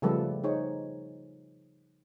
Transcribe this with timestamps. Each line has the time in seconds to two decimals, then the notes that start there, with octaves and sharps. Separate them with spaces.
0.02 C#3 F3 G3 A3 A4 B4
0.44 D#4 G#4 C5 C#5